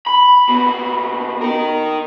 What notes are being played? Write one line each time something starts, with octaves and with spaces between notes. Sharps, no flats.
B5
A#2 B3
D#4 A#4